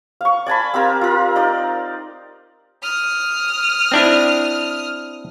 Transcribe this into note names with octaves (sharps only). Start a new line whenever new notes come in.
F5 C#6
D5 G#5 A5 B5
C4 G4 A#4 F5
F4 A#4
D#4 D5
D#6 F6
C4 D4 E4